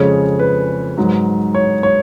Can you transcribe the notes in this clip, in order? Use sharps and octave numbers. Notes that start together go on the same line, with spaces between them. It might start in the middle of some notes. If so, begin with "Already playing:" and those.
Already playing: F2 C#3 G#3 C#5
B4
G#2 F#3
C#5
C#5